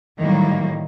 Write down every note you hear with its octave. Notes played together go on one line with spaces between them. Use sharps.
A2 D#3 E3 F#3 G3 A#3